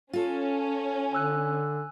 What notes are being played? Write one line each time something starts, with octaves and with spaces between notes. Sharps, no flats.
C#4 F4 A4
D3 G#5 E6 F#6